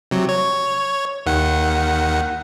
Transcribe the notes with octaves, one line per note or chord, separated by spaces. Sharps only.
C3 F#3
C#5
D#2 D#3 F#5